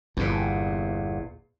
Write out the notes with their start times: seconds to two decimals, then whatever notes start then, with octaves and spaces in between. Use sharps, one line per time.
0.17 G1 E2 A#2